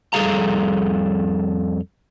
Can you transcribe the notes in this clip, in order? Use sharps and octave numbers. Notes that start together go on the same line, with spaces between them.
F2 G3 G#4 A4 F5 A#5